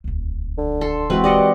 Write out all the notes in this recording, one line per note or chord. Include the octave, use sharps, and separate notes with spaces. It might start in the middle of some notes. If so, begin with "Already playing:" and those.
D#1 C#2
D3
A4 C6
E3 G#3 C4 F#4 B4
G4 D5 D#5 F#5